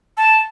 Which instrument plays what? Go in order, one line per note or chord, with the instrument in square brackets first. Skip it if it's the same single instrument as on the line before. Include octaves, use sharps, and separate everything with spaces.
[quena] A5